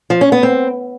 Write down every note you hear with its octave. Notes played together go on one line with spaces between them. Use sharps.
F3
C#4
B3
C4